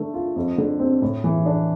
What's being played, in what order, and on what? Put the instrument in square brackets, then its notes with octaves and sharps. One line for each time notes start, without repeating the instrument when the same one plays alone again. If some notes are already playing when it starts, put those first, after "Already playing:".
Already playing: [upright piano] D3 A3
F4
F2
D3
C4
A2
E3
D4